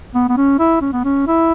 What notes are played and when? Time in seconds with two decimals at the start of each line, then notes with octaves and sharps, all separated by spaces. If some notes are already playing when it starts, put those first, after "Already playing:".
0.15 B3
0.29 B3
0.37 C#4
0.59 E4
0.81 C#4
0.93 B3
1.04 C#4
1.27 E4